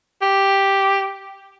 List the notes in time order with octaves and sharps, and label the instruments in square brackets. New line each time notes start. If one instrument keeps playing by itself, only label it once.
[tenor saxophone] G4